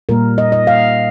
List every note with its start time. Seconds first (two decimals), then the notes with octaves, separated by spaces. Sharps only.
0.09 A#2 G3 A#3 A#4
0.38 D#5
0.52 D#5
0.67 F5